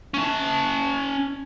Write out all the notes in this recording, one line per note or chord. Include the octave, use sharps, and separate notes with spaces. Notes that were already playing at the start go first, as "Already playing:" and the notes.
C#4 A5